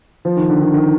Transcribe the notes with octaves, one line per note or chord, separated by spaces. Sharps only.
F3
D#3
D3
D#3
D#3